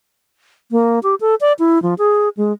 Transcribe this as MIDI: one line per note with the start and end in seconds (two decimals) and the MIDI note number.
0.71 0.99 58
1.03 1.15 67
1.21 1.35 69
1.41 1.53 74
1.59 1.81 64
1.82 1.94 53
1.98 2.29 68
2.37 2.52 56